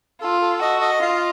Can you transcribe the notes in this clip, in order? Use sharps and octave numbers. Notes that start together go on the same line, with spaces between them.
F4 A4
A4
F#4 D#5
D#5
F4 F5